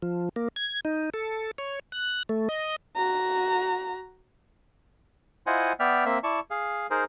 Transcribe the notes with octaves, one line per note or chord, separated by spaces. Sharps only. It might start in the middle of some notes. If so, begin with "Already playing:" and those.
F3
A#3
G#6
D#4
A4
C#5
F#6
A3
D#5
F#4 A#5
E4 F4 C5 D#5 F#5 G#5
B3 D5 E5 G5 F6
A#3 C4 E5
E4 D5 A5 C#6
G#4 F5
D#4 G#4 A#4 C5